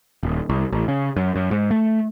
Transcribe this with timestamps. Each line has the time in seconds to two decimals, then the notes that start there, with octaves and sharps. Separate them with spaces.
0.23 D#1
0.49 C2
0.72 A1
0.88 C#3
1.16 F#2
1.36 F#2
1.51 G#2
1.71 A3